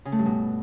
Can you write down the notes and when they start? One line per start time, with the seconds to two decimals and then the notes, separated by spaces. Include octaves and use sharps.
0.05 C#3
0.12 A3
0.19 G2
0.26 B2